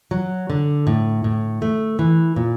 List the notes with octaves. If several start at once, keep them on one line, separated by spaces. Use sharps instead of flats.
F#3
D3
A2
A2
A3
E3
A#2